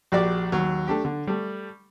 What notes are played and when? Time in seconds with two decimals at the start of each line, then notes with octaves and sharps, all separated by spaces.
0.12 A#1 F#4 G4 D5
0.52 D#2 F#3
0.88 A3 D4 G4
1.05 D3
1.27 G3 A3